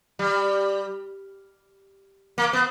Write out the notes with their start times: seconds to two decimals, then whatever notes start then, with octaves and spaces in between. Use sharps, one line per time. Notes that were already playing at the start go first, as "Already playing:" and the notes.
0.19 G3
2.38 A#3
2.53 B3